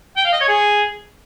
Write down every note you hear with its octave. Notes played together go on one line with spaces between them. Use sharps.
G5
F5
D#5
C#5
G#4